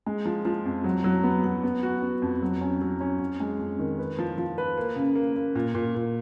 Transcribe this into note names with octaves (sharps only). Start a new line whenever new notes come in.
G#3
F3
F3
F2
F#3
F#3
B3
F#3
B3
F#4
B3
F2
F#3
C#4
F#3
C#4
F2
G#3
F2
D#3
B4
F3
F3
B4
A#3
C#3
A#3
A#3
A#2
A#2
A#2